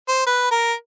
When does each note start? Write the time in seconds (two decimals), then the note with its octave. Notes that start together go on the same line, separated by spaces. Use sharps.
0.08 C5
0.27 B4
0.51 A#4